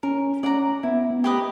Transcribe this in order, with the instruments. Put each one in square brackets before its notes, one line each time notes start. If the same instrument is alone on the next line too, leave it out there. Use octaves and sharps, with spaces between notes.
[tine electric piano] C#4 [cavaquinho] A#4
[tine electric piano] C#4 [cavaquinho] D5 F#5 A#5
[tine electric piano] B3 [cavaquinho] E4
[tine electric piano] B3
[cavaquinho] G4 B4 D#5